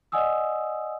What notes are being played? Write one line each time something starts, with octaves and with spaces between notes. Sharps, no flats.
D5 D#5 F#5 G#5 D#6 E6